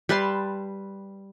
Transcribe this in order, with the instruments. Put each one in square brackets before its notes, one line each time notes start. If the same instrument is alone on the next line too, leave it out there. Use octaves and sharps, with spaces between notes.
[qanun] G3 B4 A5 C6